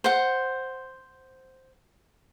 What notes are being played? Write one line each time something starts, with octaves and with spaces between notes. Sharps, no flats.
C5 F#5